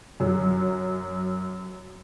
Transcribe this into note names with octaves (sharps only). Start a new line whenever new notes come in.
F#2 F#3